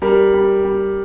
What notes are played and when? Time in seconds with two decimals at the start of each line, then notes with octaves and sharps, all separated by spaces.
0.02 G3 A#4
0.34 G3
0.65 G3